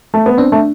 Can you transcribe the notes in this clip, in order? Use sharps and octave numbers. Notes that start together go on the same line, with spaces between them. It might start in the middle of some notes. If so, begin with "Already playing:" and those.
A3
B3
C4 D4
A3